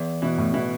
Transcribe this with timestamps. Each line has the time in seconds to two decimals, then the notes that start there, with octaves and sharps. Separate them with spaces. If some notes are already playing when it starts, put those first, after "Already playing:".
Already playing: E2 B3
0.22 B2 E3
0.38 A2
0.54 B2 E3